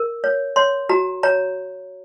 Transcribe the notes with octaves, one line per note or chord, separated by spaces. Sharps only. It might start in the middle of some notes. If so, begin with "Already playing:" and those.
Already playing: A#4
C#5
C#5 C6
F#4 A#5
C#5 A#5